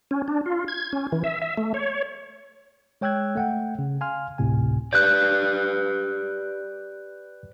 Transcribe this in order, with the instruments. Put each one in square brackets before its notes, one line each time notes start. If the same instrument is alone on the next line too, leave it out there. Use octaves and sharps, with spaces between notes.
[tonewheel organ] C#4
D4
F4
G#6
C#4
E3
E5
E5
A3
C#5
[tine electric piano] G#3 C#5 G5 E6 F#6 G#6
A3 F#5 G5
C#3
F5 G#5 C6 F6
G#1 D2 A2 C3 G#5
[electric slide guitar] G4 B4 D5 [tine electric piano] F#6 G6